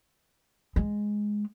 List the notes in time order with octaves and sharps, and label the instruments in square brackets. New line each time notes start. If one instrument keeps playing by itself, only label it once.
[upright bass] G#3